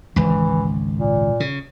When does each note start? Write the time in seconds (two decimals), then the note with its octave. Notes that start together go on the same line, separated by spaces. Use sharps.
0.16 G#1 C#2 E3
0.96 A#2
1.40 C#3